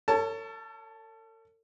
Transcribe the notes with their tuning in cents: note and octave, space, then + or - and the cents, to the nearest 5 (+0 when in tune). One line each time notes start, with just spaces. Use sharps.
A4 +45 C#5 +15 A5 +0